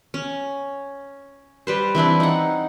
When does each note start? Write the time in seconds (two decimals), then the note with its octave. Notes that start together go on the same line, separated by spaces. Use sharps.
0.14 C#4
1.67 G3 B4 C5
1.95 E3 C4 D4 E4
2.20 D#4 F#5